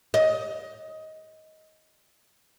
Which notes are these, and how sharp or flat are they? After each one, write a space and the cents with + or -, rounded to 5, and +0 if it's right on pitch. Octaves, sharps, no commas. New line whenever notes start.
D#5 +15